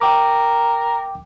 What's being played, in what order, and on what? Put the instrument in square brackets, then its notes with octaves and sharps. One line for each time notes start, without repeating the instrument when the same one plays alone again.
[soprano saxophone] A#4 [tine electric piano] G5 D6